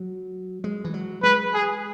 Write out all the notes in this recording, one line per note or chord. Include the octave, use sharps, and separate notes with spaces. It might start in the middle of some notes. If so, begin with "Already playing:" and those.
Already playing: F#3
G#3
E3
F#3
G#3 B4
G#4